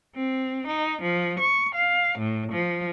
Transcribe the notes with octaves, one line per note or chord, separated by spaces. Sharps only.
C4
D#4
F3
C#6
F5
A2
F3